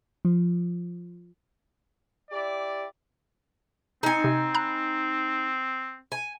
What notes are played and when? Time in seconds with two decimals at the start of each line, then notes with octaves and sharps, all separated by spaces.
0.25 F3
2.31 E4 G4 D5
4.03 C4 D#4 G#5
4.24 C3
4.54 A#5 B5 F#6
6.12 G#5